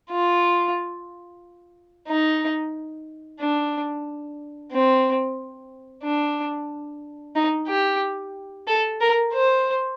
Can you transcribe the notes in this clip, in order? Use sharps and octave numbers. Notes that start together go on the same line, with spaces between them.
F4
D#4
D4
C4
D4
D#4
G4
A4
A#4
C5